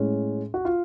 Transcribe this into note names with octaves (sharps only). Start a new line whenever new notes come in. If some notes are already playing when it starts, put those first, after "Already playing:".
Already playing: A2 G#3 C#4
F#4
F4